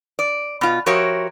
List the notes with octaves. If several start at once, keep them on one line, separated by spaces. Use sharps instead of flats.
D5
B2 F4
F3 F#4 G4 A#4 C#5 E5